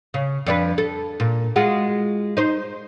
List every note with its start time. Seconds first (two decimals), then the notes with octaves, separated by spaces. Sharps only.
0.14 C#3
0.46 F2 D4 B4
0.78 A4
1.20 A#2
1.56 G#3 F4 F#4
2.37 D#4 C5